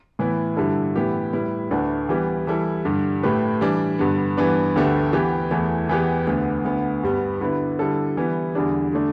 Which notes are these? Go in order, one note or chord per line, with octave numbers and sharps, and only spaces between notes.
A2 E3 B3 E4 B4
G2 D3 G3 E4 A4
A2 E3 B3 E4 G4
A2 G3 E4 B4
D2 D3 A3 D4 B4
E3 G3 B3 G4
E3 G3 E4 A4
G2 D3 G3
A2 A3 G4 B4
E3 G3 D4
G2 D3 B3
G2 E3 B3 D4 B4
D2 D3 A3 G4 B4
E3 B3 G4 B4
E2 E3 A3 E4
E2 E3 B3 G4 B4
D2 D3 B3
D2 D3 B3
G2 G3 B3
D3 B3 E4 B4
D3 G3 E4 A4
E3 G3 B3 E4
E2 D3 G3 D4
D3 A3 D4